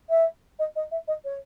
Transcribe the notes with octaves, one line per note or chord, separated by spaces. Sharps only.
E5
D#5
D#5
E5
D#5
C#5